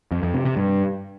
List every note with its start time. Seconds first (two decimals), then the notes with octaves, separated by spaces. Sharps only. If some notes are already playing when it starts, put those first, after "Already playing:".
0.11 F2
0.23 F2
0.34 C3
0.45 C3
0.57 G2